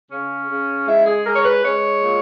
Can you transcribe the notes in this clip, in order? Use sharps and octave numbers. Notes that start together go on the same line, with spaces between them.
C#3 C#4
C#3
G#3 E4
G#4
G#3 A#4
C#5
B4
G#3 C#5
A#2